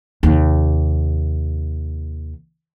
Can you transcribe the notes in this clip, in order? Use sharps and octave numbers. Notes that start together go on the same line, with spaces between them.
D#2 C3